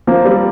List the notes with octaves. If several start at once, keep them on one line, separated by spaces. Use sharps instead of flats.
F3 A#3
G3 C4